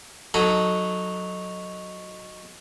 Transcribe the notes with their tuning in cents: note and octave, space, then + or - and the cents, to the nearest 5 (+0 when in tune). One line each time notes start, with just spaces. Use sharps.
F#3 -10 D#4 +0 A4 +0